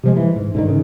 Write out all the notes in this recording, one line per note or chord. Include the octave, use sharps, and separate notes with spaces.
C3 F3 G#3
E3
G#2
G#2 D3 D#3
C#3